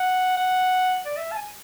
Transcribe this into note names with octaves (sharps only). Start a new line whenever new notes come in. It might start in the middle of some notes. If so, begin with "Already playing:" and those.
Already playing: F#5
F#5
D5
E5
A5
G#5